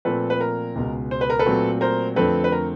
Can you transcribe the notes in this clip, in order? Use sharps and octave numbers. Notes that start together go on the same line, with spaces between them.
A#2 F3 A3 C4 A4 B4
B4
A#4
C#2 B2 G#3
C5
B4
A#4
A4 B4
A#2 F#3 A3 C4
A#4 C5
F2 D3 F3 A3 C4 A4 B4
B4
A#4